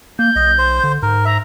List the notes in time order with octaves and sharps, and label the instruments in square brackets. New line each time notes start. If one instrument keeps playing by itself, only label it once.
[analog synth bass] A#3 [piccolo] G6
[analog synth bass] B1 [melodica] D#5
[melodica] C5
[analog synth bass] D3
[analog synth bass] G#2 [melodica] A#4
[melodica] E5 [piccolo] A#5